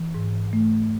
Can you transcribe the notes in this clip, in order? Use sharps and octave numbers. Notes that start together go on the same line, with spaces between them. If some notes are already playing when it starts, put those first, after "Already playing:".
Already playing: E3
G#2
A3